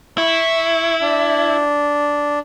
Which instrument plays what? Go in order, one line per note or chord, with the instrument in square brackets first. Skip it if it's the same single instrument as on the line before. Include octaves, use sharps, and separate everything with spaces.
[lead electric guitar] E4 [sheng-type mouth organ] C#6
[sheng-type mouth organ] D4